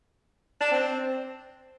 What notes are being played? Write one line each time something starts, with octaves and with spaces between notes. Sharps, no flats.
D4
C4